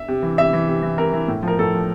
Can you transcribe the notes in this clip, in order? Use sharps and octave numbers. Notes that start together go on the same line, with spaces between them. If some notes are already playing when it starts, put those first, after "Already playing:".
Already playing: E5
C3
E3
C3 E5
E3
C3
E3
C3 A#4
E3
A2
F3 A#4
A2 A4
F3